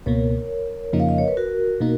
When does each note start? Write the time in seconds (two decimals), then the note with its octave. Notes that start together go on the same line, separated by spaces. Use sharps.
0.06 C#2 B2 A#3 A#4 C#5
0.93 F2 C#3 F3 A#3 D#4
1.00 F5
1.09 D#5
1.18 C#5
1.28 B4
1.37 F#4 A#4
1.81 B2 A#3 D#4